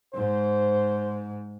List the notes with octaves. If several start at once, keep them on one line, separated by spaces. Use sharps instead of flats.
G#2 C5